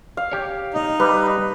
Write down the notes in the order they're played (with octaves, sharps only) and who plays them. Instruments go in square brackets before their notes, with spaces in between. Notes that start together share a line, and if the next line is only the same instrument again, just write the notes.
[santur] F5
[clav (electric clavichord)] G4 C#5
[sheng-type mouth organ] D#4
[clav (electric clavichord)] G3 [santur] B4